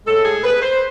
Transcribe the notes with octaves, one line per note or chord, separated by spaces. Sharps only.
A2 G#3 A4
G#4
B4
C5